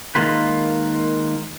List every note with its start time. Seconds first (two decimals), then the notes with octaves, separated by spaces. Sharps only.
0.15 D#3 F3 G#3 A#3 F4 B4